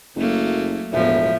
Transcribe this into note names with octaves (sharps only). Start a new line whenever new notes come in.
F#1 F#3 A3 A#3
E1 A2 F3 B3 E5